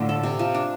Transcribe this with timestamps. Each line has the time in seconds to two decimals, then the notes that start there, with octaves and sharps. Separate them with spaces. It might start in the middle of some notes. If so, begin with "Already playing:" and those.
Already playing: A2 D3 A3 F4
0.09 A4
0.23 C3
0.39 F3
0.54 D4